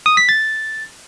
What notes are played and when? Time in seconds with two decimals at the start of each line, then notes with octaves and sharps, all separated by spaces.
0.06 D#6
0.17 B6
0.29 A6